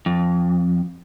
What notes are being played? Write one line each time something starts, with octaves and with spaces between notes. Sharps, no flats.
F2